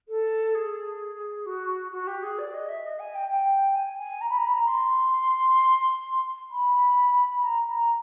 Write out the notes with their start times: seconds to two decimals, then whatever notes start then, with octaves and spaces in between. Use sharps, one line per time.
0.08 A4
0.55 G#4
1.46 F#4
1.92 F#4
2.07 G4
2.23 G#4
2.38 D5
2.54 D#5
2.69 E5
2.84 D#5
2.99 G#5
3.15 G5
3.29 G5
3.75 G#5
3.98 G#5
4.21 A#5
4.30 B5
4.38 A#5
4.46 B5
4.53 A#5
4.68 C6
6.51 B5
7.43 A#5
7.74 A#5